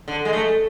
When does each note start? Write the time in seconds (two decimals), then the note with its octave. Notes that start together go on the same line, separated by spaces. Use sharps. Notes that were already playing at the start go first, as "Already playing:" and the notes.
0.08 D3
0.25 G#3
0.33 A3